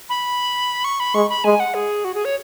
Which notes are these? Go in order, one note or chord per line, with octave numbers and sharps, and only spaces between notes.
B5
C#6
B5
G#3 C#6
B5
G#3 G#5
F#5
G#4
F#4
G#4
C#5